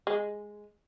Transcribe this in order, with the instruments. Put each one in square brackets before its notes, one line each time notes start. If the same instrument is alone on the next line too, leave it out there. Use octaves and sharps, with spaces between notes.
[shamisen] G#3